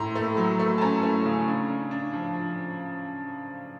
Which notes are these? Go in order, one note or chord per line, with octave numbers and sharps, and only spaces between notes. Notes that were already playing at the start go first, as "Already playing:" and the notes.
Already playing: A2 A#5 C6
A3
F#3
A3
A5
C#4 G#5 A#5
A3
C#3
D4
D4
D4
F3